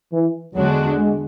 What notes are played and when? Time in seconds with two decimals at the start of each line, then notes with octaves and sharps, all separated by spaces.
0.13 E3
0.55 E2 D3 F#3 G#3 D4 F#4
0.98 G#3